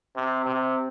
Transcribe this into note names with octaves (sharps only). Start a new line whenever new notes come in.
C3 C4
C3